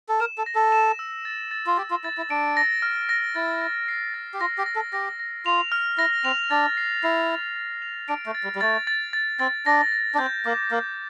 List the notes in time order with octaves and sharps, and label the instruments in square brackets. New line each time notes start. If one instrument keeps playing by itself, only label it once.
[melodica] A4
[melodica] A#4 [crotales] E7
[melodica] A4
[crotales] A#6
[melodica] A4
[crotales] E7
E6
A6
A6
[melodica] F4
[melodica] G4 [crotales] A6
[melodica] F4
[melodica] E4 [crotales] A6
[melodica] E4
[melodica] D4 [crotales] D7
[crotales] A#6
F6
A#6
[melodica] E4 [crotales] A6
[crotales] A6
C7
A6
[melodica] G4
[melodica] F4 [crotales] A#6
[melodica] G4
[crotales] A#6
[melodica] A4
[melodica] G4 [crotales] A#6
[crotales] A#6
[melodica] F4 [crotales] F7
[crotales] F6
[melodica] E4 [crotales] A#6
[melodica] C4 [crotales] F7
[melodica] D4 [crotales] A6
[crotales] C7
[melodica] E4 [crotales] C7
[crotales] A6
A6
F7
[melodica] D4 [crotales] D7
[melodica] A3
[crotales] A6
[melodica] G3
G3
[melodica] A3 [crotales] A6
[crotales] A6
A6
[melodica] C4 [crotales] A6
[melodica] D4 [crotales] A#6
[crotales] A#6
[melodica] D4
[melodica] C4 [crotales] G6
[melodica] A#3 [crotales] D6
[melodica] A#3 [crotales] A#6